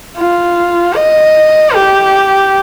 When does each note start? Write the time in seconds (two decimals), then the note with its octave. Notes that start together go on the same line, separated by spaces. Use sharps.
0.17 F4
0.95 D#5
1.74 G4